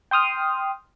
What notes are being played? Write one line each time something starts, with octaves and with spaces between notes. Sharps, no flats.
G5 C6 D#6 F6